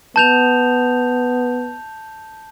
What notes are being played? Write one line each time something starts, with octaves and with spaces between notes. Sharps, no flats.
B3 A5 G6 F7